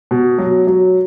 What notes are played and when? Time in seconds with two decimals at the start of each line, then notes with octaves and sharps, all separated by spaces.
0.11 B2
0.38 F#3
0.67 F#3